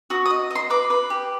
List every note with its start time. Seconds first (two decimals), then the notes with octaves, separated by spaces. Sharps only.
0.10 F#4 D#6
0.26 D#6
0.30 D#5
0.51 D#5 C6
0.70 B4 D6
0.90 B4
1.10 G4